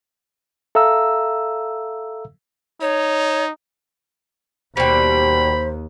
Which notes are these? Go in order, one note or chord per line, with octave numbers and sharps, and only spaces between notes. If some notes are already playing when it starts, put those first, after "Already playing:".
A4 E5 F5 A#5 E6
D#4 C#5
D#2 B2 G3 C5 B5